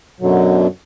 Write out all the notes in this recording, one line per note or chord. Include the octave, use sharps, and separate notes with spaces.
F#2 B2 D3 F#3